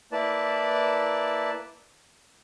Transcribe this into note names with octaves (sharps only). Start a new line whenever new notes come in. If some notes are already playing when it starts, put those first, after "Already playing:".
A#3 E4 B4 D5 A5